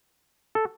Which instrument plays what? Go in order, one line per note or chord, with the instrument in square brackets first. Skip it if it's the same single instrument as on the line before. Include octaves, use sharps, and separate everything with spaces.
[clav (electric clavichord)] A4